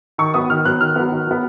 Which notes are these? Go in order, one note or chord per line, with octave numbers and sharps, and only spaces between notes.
D#3 C#6
F#3 B3 D#6
D#3 F6
F#3 B3 F#6
D#3 F6
F#3 B3
D#3
F#3 B3